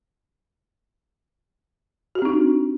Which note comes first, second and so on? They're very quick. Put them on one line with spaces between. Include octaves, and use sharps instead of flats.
F#4 G4 C4 D#4 D4